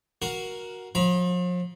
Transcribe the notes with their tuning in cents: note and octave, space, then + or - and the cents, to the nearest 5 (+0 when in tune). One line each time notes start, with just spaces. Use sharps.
F#4 +0 A#4 +10 F5 +0
F3 +40 F5 -40 A#5 +45